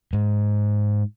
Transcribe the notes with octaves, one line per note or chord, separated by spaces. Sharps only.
G#2